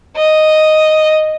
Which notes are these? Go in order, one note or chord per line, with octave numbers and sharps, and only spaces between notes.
D#5